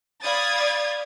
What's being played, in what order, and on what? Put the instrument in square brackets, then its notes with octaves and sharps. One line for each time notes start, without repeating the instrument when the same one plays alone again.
[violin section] D5 F5 B5 D#6 G#6 A6